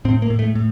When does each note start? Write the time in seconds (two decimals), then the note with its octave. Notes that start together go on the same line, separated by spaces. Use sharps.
0.05 A2 C4
0.22 A#3
0.30 A2
0.39 A3
0.55 A2